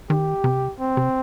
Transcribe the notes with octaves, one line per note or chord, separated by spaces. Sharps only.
D#3 G4
C3
C4
C3